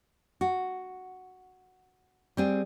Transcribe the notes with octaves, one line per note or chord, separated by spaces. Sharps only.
F#4
G3 C4 G#4